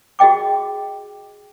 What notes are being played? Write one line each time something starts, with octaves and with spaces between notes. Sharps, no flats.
F#4 G#4 D#5 G5 D6